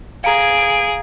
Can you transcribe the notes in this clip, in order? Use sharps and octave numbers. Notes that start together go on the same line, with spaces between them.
G#4 F5 A#5 G#6 D7